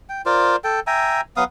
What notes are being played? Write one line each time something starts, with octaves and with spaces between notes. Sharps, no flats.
G5
F4 A#4 C5 D5
A4 G5
E5 G5 G#5 A#5
F#3 B3 F5 D#6